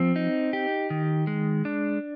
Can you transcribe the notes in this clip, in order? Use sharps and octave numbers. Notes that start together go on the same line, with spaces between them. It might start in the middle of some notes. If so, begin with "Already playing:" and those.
Already playing: F3 C4
D#4
G4
D#3
G#3
D4